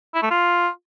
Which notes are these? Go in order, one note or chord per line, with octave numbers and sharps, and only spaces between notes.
E4
A3
F4